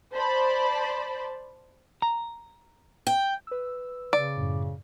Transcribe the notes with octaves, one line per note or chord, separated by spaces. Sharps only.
C5 D5 A5 B5
A#5
G5
B4 E6
C#3 D5
F#2 A2